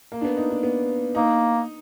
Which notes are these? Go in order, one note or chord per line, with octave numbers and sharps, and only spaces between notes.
A#3
D4
B3
D#4
D4
B3
A#3 D#4